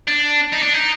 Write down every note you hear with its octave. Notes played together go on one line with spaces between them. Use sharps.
D4
D#4
D4
D#4